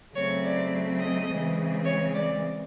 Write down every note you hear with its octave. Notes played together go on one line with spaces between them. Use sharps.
C#3 F#3 A3 C4 C#5
D5
D#5
C#3 E3 G#3 C4
C#5
D5